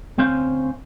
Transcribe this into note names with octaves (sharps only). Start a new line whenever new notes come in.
D2 C4 C#4 C5 F5